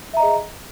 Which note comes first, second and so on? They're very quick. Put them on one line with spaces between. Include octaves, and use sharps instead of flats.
E5 A#5 D#5 G#4